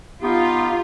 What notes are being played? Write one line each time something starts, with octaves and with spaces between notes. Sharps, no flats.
B3 D#4 F4 G4